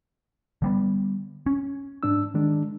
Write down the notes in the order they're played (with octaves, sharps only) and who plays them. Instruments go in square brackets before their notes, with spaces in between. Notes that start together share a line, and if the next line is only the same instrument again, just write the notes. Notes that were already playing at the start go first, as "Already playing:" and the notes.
[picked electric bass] D3 G3 B3
C#4
[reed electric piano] G#2 D4 E6
D#3 G#3 D4